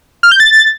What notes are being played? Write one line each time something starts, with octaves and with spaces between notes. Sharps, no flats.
F6
G6
A6